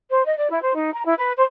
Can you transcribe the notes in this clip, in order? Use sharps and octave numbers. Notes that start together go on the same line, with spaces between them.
C5
D#5
D5
E4
C5
D#4
A#5
E4
B4
C5